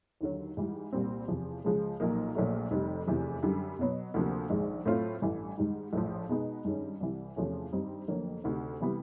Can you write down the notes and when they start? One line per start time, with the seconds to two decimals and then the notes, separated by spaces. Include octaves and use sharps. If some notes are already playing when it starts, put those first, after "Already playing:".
0.21 D#2 D3 F#3
0.57 G#2 E3 G3
0.93 C2 A#2 G3 C4
1.28 E2 C3 F3
1.64 C#2 C#3 F3 G#3
2.00 B1 A#2 F3 A#3 D#4
2.35 A#1 A#2 F#3 A3
2.71 F1 F2 C3 D#3 G3
3.08 F1 E2 C3 E3
3.43 F#2 D3 G3
3.79 B2 F#3 B3
4.14 D2 C3 F3 A#3 D4
4.50 A#1 G#2 D#3 G#3
4.85 A2 F#3 A3 C4 F4
5.22 A1 G2 E3 A3
5.58 G#2 D#3 G3
5.93 A#1 A2 F3
6.29 B2 G#3 B3 D#4
6.65 G2 D#3 G#3 C#4
7.00 C2 C3 E3
7.36 E2 C3 F3 A3 C#4
7.72 G2 D#3 G3 C4 D#4
8.08 F1 F2 D3 F#3 A#3
8.44 D2 C3 D#3
8.80 C3 E3 G3 B3